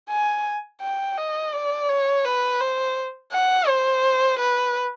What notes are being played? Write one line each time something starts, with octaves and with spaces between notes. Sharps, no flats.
G#5
G5
D#5
D5
C#5
B4
C5
F#5
C5
B4